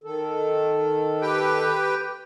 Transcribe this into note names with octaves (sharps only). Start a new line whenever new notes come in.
D#3 A4
G4 B4 G5